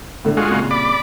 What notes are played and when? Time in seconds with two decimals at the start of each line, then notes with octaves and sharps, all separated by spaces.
0.25 A2 D3
0.37 G#3 F4 F#4 G#4 A4
0.50 C2 A#2 C#3
0.71 D5 B5 D6